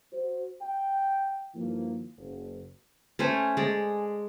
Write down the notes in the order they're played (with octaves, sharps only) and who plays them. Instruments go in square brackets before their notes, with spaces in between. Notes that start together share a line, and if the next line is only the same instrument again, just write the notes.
[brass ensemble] F#4 C5
G5
G2 D#3 F3 A#3 E4
F#1
[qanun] A3 C#4 C5 G#5
G#3 D5